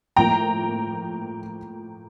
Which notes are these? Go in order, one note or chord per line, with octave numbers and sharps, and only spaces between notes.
A2 F3 A#3 G5 A#5